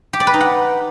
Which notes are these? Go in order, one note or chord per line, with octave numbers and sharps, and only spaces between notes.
G4
D5
B4
D#4
F#5